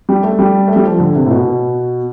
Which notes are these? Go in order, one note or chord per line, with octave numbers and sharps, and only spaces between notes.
G3
A3
G3
A3
G3
F3
D3
C3
A2
B2